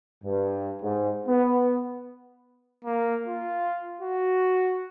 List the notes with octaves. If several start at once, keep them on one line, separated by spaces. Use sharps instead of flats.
G2
G#2
B3
A#3
F4
F#4